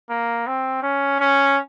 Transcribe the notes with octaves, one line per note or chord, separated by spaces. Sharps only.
A#3
C4
C#4
C#4